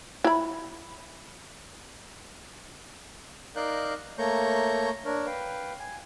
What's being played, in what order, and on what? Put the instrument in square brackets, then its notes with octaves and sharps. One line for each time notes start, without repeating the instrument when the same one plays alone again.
[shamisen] E4 B5
[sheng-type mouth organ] D#4 A#4 D5 F5 F#6 G6
A3 A#3 C#5 A#5 C#6 G6
D4 A#4 C#5
B4 F5 G5
G#5